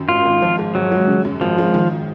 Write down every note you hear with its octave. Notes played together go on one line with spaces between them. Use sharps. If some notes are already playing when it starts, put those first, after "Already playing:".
Already playing: F#2 D#3
G#1 F4
G#1
F3
G#2
G#1 F#3
G#3
C#3
F#2
G#1 F3
G#3
D#3